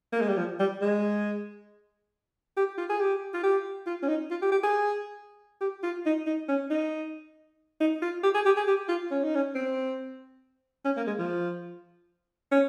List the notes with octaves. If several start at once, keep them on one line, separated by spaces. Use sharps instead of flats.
A#3
G#3
G3
F3
G3
G#3
G4
F4
G#4
G4
F4
G4
F4
C#4
D#4
F4
G4
G4
G#4
G4
F4
D#4
D#4
C#4
D#4
D#4
F4
G4
G#4
G4
G#4
G4
F4
C#4
D#4
C#4
C4
C#4
A#3
G#3
F3
C#4